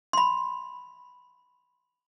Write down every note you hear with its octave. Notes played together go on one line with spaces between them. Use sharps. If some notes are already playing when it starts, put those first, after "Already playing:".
B5 C6